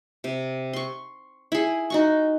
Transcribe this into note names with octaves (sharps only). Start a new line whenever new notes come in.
C3
C6 C#6
E4 G#4
D#4 F#4 C#6